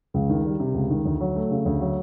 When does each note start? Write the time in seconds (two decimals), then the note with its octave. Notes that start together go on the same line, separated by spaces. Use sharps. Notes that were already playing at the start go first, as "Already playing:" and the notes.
0.14 C#2
0.30 D#3
0.45 G3
0.60 C3
0.74 C#2
0.90 D#3
1.05 D2
1.21 F#3
1.36 A3
1.51 C#3
1.65 D2
1.81 F#3